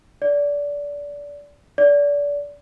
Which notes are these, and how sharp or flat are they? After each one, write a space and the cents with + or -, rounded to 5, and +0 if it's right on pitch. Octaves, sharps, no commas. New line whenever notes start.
D5 -25
D5 -30